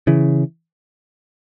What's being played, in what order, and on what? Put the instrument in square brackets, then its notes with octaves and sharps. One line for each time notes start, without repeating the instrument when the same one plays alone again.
[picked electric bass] C#3 E3